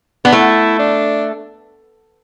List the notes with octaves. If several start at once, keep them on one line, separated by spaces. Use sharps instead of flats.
B3 D4
A3 E4
D4